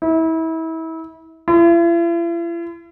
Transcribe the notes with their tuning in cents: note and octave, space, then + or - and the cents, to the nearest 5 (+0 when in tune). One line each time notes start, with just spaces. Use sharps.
E4 -30
E4 +45